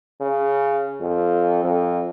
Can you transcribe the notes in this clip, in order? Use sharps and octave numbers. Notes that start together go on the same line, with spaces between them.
C#3
F2
F2